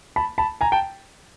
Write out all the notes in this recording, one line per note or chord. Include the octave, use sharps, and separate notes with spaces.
A5 B5
A5 B5
G#5 A#5
G5 A5